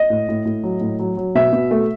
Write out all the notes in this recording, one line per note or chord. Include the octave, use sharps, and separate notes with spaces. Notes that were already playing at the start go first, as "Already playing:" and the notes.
Already playing: D#5
A2
A2
A2
F#3
A2
F#3
F#3
B2 E5
B2
A3